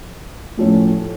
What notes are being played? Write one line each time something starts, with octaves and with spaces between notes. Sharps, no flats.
A2 F3 A3 C#4